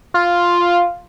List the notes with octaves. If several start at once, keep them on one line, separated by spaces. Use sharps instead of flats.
F4